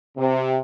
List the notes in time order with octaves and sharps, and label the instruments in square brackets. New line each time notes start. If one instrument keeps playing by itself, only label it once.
[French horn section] C3